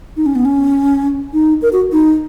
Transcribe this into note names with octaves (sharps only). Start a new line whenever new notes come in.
D#4
C#4
B3
C#4
D#4
A#4
F#4
D#4